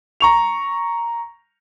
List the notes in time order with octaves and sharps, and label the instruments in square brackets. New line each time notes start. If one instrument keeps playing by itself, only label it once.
[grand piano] A#5 C#6 F7